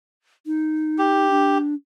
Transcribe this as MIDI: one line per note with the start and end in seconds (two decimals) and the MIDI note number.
0.46 1.30 63
0.99 1.58 67
1.30 1.74 62